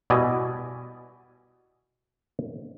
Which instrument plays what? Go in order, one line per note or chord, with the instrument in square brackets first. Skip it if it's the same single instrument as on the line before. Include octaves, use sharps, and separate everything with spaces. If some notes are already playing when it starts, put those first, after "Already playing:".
[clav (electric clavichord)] B2 G3 E4 D5 D#5 G#5